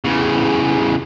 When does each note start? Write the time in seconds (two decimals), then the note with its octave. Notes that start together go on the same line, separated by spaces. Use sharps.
0.04 E2 C#3